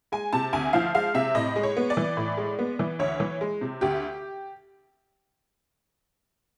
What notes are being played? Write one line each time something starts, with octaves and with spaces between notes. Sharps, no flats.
G#3 G#5
C3 A5
D2 G#5
F3 F5
G#3 F5
C3 E5
A2 D#5
G#3
C#5
B3
D5
E3
A2
G#3
B3
E3
D2 C#5
E3
G#3
C3
D2 G4